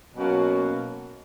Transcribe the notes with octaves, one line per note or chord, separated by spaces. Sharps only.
B2 F#3 A#3 C#4 F#4